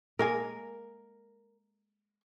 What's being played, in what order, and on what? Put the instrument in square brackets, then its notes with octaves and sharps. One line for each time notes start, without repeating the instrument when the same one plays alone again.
[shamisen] G#3 A#3 G#5 [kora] A#4